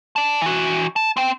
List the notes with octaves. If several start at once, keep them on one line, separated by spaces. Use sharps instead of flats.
D5 A5
E3 F#4
A5
C4 G5